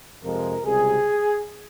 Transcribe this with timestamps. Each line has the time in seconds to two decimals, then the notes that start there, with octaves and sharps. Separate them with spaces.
0.23 F2 C3 F3 G#3 A#4
0.64 C#2 C3 G3 G#4